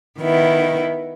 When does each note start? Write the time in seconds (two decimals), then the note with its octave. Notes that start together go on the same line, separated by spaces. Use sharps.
0.20 D#3 B3 E4